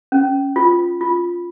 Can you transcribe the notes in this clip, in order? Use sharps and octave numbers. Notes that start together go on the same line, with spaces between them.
C#4
F4
F4